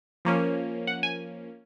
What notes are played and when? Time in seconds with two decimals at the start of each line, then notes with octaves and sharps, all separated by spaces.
0.25 F3 A#3 C#4
0.87 F#5
1.03 G#5